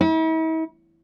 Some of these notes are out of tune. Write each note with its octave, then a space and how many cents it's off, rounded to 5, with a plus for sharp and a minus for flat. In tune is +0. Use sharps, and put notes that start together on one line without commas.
E4 -45